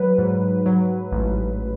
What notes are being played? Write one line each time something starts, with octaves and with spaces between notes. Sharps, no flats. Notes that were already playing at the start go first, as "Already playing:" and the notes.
Already playing: F#3 B4
G#2
F#3
A1